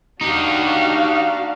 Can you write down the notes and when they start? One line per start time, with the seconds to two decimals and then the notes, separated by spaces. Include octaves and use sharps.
0.21 D4 D#4 F#4 G4 F5